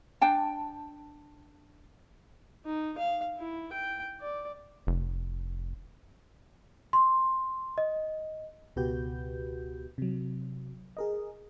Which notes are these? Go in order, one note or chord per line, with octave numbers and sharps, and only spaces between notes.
D4 G5 A5
D#4
F5
E4
G5
D5
F1
C6
D#5
C#2 B2 F#4 G4 B4 G6
C3 F#3
G#4 A#4 D#5